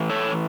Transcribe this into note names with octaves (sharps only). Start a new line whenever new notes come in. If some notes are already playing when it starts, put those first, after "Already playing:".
Already playing: A2 E3
A4 C#5